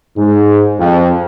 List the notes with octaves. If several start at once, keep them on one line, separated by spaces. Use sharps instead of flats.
G#2
F2